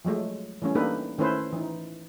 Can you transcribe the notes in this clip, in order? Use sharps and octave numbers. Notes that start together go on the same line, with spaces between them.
F3 F#3 G#3 A3
E3 G3 A3 C#4
A#3 D4 D#4 G4 A4 B4
D#3 A3 C#4 E4 B4 C5
E3 D#4